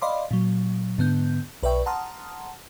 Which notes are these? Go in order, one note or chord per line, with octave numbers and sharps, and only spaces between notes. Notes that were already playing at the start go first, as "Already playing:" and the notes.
D5 D#5 F5 B5 C6 D6
A#2 F#3
G#2 D3 B3 G6
B1 B4 D5 E5 G5 C#6
F#5 A5 A#5 C6 D#6 F6